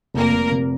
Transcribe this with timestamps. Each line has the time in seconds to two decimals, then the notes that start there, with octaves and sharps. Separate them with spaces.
0.14 F1 A#3 A#4
0.33 F1
0.52 C3